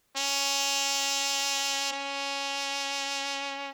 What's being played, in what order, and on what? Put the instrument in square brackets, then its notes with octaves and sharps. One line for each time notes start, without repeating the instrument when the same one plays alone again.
[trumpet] C#4
C#4